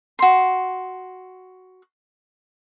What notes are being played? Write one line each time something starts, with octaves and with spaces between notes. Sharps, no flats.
F#4 C6